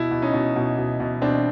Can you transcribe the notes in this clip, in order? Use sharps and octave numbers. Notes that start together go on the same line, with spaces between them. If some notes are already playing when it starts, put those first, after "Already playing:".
Already playing: B2 E4
B2
C#4 D#4
B2
B2
B2
B2
B2 C4 D4